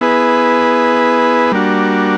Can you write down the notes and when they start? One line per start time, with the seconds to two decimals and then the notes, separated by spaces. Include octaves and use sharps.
0.01 B3 E4 G#4 B4
1.52 G3 A#3 D4 F#4